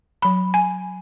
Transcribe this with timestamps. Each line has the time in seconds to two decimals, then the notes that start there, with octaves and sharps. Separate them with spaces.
0.22 F#3 B5
0.54 G#5